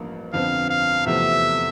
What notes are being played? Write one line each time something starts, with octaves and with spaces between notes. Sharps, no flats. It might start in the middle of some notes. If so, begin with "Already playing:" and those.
Already playing: A1 G2 F3 A#3 F4
G1 F2 D3 F3 C4 F5
F5
E2 C3 F3 A3 C4 E5